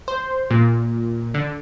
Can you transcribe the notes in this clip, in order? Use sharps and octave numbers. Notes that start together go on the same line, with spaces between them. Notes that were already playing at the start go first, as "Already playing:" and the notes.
C5
A#2
D3